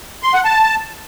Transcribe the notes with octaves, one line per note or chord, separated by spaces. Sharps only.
C6
F#5
A5